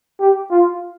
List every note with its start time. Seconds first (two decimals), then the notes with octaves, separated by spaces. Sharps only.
0.20 G4
0.51 F4